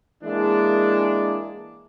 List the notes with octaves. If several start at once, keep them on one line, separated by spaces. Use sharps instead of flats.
E3 G#3 A#3 D4